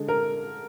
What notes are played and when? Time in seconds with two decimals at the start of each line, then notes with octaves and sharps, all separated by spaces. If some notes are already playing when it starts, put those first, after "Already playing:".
Already playing: D3 G#3
0.08 A#4